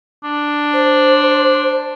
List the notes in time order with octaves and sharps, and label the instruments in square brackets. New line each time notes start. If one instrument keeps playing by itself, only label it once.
[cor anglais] D4
[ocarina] C5